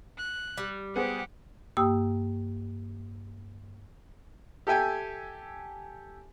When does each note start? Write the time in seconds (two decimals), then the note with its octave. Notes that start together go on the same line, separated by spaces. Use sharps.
0.18 F#6
0.58 G3
0.96 B3 G4 G#4 C5 F#5
1.77 G2 A#3 G4 G5 D#6 E6
4.67 G4 A4 E5 G5 G#5